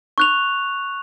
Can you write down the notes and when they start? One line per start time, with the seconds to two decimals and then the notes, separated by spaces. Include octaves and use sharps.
0.18 C#6 F#6 F7